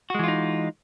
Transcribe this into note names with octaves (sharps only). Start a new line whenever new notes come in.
E3 G#3 D#4 F4 F#4